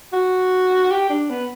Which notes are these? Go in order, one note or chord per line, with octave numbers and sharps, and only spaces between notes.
F#4
G4
D4
B3